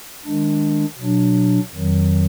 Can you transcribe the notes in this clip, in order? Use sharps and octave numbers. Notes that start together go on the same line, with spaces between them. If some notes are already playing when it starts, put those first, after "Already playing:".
D#3 G#3 D4
B2 F#3 D4
F2 D#3 F#3